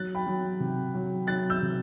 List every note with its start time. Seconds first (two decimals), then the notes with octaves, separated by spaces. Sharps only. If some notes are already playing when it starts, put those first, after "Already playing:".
Already playing: F#3 F#6 A6
0.15 G5 B5
0.26 F#3
0.60 C3
0.94 F#3
1.27 F#3 F#6 A6
1.50 E6 G6
1.62 C3